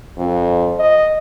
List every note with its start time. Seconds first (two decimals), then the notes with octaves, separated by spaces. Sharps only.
0.18 F2
0.79 D#5